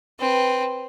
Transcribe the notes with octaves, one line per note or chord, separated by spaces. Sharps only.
C4 B4